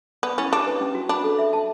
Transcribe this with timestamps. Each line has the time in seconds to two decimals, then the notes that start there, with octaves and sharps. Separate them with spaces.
0.23 B3 D5
0.38 C#4 E4
0.52 D4 G4
0.67 B4
0.81 C#4
0.95 F#4
1.09 D4 B5
1.24 A4
1.39 E5
1.53 A5